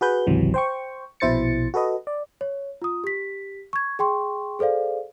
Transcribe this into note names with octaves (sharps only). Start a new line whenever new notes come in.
F#4 G#4 B4 G6
G#1 C#2 C3 E3 F#3
C5 G5 C#6
A#1 B2 E4 C5 A6 C#7
F#4 A4 B4 D#5
D5
C#5
F4 D#6
G4 B6
C#6 G#6
G#4 G5 C6 C#6
G#4 A4 C5 D5 F5